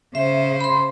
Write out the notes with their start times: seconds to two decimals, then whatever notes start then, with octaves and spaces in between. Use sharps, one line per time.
0.15 C#3 C5 E5
0.61 B5 C6